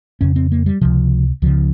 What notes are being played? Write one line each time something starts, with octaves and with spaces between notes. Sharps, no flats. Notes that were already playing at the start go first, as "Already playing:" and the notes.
F2 C#3 C#4
C4
A#3
G3
C#2 C3 F3
C#2 C#3 F3